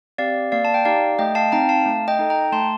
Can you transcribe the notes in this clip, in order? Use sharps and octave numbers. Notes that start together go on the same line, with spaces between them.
C4 G4 D5 F5
A#3 D5 F5
A5
G5
D#4 G4 D5 F5
A3 D#5 G5
F5 A5
C4 D#4 G5 A#5
F5 A5
A3
D#5 G5
D#4 A4
G5 A#5
A3 A5 C6